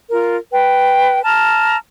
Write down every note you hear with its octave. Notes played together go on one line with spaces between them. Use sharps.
F4 A#4
B4 G5
A5 A#5 F6